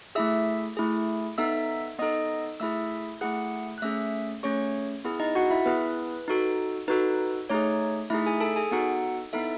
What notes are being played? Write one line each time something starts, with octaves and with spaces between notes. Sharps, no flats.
A3 E4 G#4 E5 E6
A3 E4 G#4
B3 D#4 A4 E5 E6
B3 D#4 A4 D#5 D#6
A3 E4 G#4 E5 E6
A3 E4 G#4 F#5 F#6
F#6
A3 C#4 G#4 E5 E6
A3 C#4 G#4 C#5 C#6
B3 E4 G#4
D#4 D#5
F#4 F#5
E4 E5
B3 E4 G#4 B4
D#4 F#4 A4
D#4 F#4 A4 B4
A3 D#4 G#4 C#5
A3 D#4 E4 G#4 E5
G#4 G#5
A4 A5
G#4 G#5
B3 D#4 F#4 A4 F#5
B3 D#4 E4 A4 E5